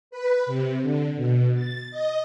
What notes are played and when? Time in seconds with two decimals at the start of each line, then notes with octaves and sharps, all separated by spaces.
0.11 B4
0.46 C3
0.82 D3
1.16 B2
1.55 A6
1.91 D#5